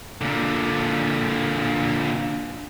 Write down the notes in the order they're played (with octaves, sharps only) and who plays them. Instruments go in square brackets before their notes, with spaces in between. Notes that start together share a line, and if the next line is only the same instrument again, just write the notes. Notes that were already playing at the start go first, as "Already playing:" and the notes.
[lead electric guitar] A#2 D3